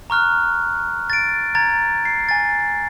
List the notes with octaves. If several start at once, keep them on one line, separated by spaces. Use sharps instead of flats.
A#5 C#6 F6 F#6
A6 D7
A#5 G#6 A6
C7
G#5 A6